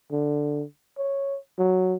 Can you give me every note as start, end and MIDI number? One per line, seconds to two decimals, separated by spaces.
0.12 0.63 50
0.98 1.37 73
1.58 1.95 54